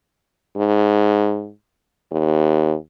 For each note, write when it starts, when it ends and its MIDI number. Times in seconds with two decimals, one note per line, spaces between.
0.57 1.50 44
2.12 2.75 39